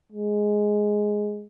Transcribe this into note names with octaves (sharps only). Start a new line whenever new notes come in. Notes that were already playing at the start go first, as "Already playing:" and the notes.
G#3